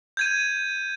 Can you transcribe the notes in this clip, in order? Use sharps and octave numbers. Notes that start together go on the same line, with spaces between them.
G6 G#6 D#7